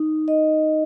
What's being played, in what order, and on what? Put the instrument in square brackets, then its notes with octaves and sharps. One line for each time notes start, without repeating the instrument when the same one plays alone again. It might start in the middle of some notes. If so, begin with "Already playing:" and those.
Already playing: [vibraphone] D#4
D#5